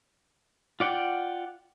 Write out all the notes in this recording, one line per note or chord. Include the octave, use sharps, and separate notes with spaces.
F4 D5 F#5 G5